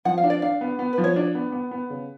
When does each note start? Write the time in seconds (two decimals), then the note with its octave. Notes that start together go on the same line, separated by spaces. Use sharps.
0.05 F3 F#5
0.18 F5
0.24 D4
0.30 D5
0.42 D4 F5
0.61 B3
0.79 B3
0.93 B4
0.98 F3
1.04 C#5
1.16 D4 D5
1.35 B3
1.52 B3
1.71 B3
1.90 C#3